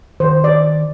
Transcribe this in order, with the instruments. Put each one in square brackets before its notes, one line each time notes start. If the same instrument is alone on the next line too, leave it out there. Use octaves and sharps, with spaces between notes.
[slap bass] D#3 [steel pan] C5
[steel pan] D5